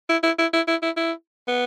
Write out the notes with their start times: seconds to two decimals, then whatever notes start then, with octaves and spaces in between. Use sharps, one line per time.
0.09 E4
0.23 E4
0.38 E4
0.53 E4
0.68 E4
0.82 E4
0.96 E4
1.48 B3